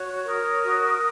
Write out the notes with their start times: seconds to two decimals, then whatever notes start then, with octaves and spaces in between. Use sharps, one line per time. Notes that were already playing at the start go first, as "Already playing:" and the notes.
Already playing: F#4 C#5
0.25 A#4 D#6
0.64 F#4